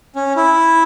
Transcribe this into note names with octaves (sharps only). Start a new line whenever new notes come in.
C#4
E4